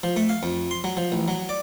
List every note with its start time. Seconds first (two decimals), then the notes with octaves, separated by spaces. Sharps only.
0.03 F3
0.16 A3
0.29 F5
0.43 F2
0.71 C6
0.84 F#3
0.97 F3
1.12 A1
1.28 F#3
1.49 D5